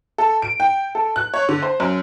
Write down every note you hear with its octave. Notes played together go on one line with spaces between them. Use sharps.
A4
D7
G5
A4
F#6
C#5
D3
C5
F#2